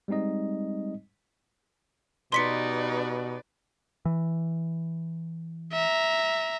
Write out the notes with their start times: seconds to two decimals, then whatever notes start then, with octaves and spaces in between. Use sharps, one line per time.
0.08 G3 G#3 C4 D#4 D#5
2.32 B2 D#4 G4 B4 D5 C6 B6 C#7
4.05 E3
5.73 E5 A#5